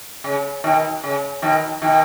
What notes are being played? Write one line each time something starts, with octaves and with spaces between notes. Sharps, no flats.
C#3
B2 D#3
C#3
B2 D#3
B2 D#3